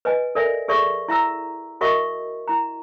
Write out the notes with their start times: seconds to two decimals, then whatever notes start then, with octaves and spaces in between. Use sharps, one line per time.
0.05 B4 D#5 G#5
0.35 A4 A#4 D5 E5 G#5
0.68 G#4 A4 D5 E5 C#6
1.08 E4 E5 A#5 E6
1.81 F#4 A#4 D#5 E5 C#6
2.48 E4 A#5